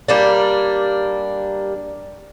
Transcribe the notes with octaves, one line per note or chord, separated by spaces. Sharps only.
G3 A#3 D4